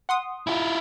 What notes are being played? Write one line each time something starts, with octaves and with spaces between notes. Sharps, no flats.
F#5 C6 D#6
E4 F4